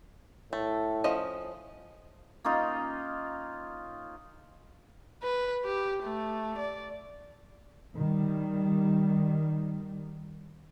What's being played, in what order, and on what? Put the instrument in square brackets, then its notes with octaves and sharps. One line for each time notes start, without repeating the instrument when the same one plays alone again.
[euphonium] A2 [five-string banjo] A3
[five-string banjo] F3 C#4 D#5
[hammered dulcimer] A#3 C#4 D#4 F4
[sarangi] B4
G4
A3
D5
[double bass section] D#3 G3